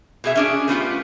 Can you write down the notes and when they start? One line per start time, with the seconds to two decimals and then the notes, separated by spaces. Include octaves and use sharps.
0.24 B2 G#4 E5
0.36 C#4 D4 G#4
0.68 A3 B3 F4 G4